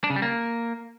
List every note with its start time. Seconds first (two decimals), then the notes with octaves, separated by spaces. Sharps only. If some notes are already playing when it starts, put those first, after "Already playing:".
0.04 D4
0.10 C#3
0.16 G3
0.22 A#3